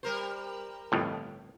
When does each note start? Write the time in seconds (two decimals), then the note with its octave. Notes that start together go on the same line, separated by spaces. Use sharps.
0.03 G3 A#4 C5
0.92 G1 F2 A2